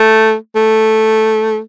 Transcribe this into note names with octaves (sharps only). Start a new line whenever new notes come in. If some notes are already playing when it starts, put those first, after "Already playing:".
Already playing: A3
A3